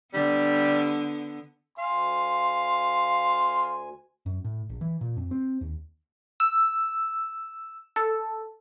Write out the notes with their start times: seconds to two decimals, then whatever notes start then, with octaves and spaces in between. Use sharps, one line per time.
0.13 D3 G3 B3
1.78 D2 F5 G#5 C6
4.26 F#2
4.44 A2
4.69 A#1
4.81 E3
5.01 A#2
5.16 F2
5.31 C4
5.61 D#2
6.40 E6
7.96 A4